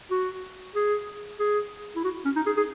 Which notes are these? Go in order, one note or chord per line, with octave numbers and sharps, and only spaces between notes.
F#4
G#4
G#4
E4
F#4
C#4
D#4
G#4
G#4